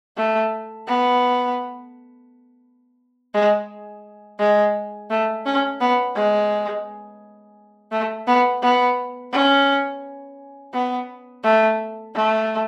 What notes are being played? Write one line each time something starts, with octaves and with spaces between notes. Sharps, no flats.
A3
B3
G#3
G#3
A3
C#4
B3
G#3
A3
B3
B3
C#4
B3
A3
A3